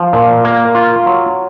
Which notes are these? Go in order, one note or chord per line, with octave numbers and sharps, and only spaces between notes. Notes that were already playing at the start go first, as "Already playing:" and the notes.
Already playing: F3
A#2
A#3
F4
F#3